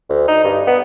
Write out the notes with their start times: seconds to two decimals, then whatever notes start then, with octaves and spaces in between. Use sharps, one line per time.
0.09 D2
0.28 D#4
0.44 G2
0.67 B3